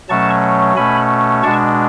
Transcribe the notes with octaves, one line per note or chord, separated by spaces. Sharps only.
B2 F#3 A3 C#4 A5 C#6
B2 A3 C#4 G#5 B5
B2 G#3 D4 A5 C#6